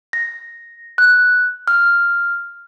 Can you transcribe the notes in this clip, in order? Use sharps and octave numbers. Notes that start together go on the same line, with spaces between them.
A#6
F#6
F6